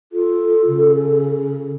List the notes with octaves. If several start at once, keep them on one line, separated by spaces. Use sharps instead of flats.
F4 A4
C#3